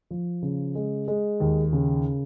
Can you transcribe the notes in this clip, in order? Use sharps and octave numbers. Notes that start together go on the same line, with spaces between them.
F3
C#3
G#3
G#3
D#2
C#3